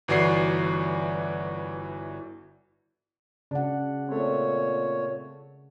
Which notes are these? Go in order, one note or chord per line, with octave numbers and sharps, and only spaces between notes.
G1 E3 F#4 D5 C7
C#3 D4 F#5
A#2 A3 C4 C#5